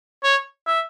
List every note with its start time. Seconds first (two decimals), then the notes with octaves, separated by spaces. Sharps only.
0.23 C#5
0.67 E5